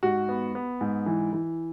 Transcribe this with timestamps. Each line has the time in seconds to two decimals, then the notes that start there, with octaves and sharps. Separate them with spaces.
0.03 G#2 F#4
0.29 B3
0.55 B3
0.81 G#2
1.06 E3
1.33 E3